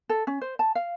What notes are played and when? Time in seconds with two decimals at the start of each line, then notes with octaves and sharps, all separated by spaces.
0.09 A4
0.27 C#4
0.41 C5
0.59 A5
0.75 F5